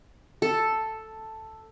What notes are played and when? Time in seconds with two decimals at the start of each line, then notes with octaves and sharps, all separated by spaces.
0.42 A4